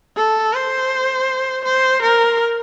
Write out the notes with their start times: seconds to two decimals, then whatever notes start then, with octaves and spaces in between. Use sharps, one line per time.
0.16 A4
0.53 C5
1.64 C5
2.02 A#4